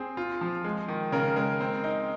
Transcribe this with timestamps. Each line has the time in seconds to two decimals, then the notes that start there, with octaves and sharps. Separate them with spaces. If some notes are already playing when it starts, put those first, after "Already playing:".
Already playing: C4 G#4
0.17 F4
0.41 F3
0.64 G#3
0.88 D#3
1.12 C#3 A#4
1.36 G#3 A#4
1.61 C4
1.84 D#4